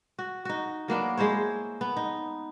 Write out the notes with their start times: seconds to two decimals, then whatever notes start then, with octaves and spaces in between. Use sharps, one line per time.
0.19 F#4
0.45 D#4 F#4
0.88 F#3 A#3 B3 D4
1.17 G#3 E4 C5 C#5
1.81 B3
1.97 D#4